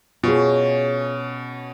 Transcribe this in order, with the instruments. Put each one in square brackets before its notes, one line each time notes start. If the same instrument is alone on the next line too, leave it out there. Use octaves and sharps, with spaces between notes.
[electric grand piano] B2 [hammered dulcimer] C#4 [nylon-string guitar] F4 G#4